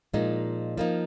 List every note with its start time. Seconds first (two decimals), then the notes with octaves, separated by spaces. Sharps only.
0.14 A#2 F3 G#3 D#4
0.77 F3 A#3 D#4